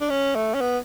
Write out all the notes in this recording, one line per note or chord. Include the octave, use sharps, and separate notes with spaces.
D4
C#4
A3
C#4
B3